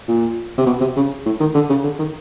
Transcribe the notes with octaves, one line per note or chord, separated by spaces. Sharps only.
A#2
C3
B2
C3
C#3
A2
D#3
D3
C#3
D3
D#3